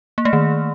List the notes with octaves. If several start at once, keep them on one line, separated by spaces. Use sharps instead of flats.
A#3
A3
D#3